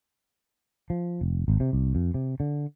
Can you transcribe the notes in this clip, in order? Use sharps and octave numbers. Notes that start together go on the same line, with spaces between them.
F3
F1
G#1
C3
C2
F2
C3
D3